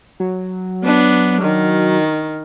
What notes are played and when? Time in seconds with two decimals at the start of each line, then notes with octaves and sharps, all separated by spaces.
0.20 F#3
0.84 B3 D4
1.41 D#3